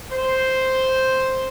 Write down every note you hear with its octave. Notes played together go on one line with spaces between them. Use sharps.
C5